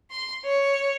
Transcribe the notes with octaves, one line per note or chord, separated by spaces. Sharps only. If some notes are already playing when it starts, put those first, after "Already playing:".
C6
C#5